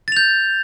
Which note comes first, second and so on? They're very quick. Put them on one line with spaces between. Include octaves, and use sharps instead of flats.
A6 F7 G6